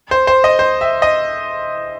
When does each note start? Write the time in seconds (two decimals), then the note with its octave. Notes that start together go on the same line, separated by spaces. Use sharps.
0.11 C5
0.27 C5
0.44 D#5
0.59 C5
0.81 E5
1.02 D#5